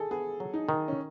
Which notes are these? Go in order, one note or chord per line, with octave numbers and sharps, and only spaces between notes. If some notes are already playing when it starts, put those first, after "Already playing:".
Already playing: D#3 G#4 A4
B3 G#4
F#3
D#4
D#3
C#4